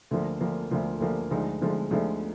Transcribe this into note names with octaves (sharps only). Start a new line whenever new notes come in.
D2 D3 F3 A#3
D2 D3 F3 A#3
D2 D3 F3 A#3
D2 D3 F3 A#3
D2 D3 F3 G#3 D#4
D2 D3 F3 G#3 D#4
D2 D3 F3 G#3 D#4